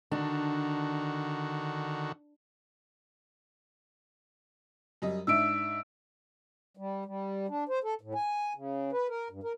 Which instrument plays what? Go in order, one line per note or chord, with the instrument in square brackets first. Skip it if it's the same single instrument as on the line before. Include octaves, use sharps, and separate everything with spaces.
[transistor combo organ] D3 D#3 F#4 [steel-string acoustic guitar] D4
[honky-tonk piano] F#2 G3 D#5
[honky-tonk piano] G#2 D4 E5 [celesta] E6 D7
[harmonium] G3
G3
D4
C5
A4
A2
G#5
C#3
B4
A#4
G2
A#4